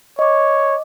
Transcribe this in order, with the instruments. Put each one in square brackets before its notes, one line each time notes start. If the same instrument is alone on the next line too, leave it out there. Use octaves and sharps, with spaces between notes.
[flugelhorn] C#5 [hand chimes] D#5 D6